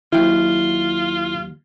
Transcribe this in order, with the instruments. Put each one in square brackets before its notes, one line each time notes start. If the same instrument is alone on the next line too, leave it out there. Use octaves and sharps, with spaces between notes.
[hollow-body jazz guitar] D#2 F#3 G5 [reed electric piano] E4 [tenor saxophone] F4